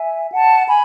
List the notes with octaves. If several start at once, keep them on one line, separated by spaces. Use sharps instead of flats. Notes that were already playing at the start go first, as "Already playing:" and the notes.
Already playing: E5 G#5
F#5 A5
G#5 B5